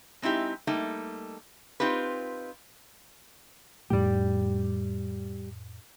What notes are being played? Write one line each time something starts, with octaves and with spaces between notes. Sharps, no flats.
G#3 C4 D#4 E4 G4
G3 A3 A#3 D#4
C4 D#4 F4 G4 B4
F2 A2 G3 A3 G4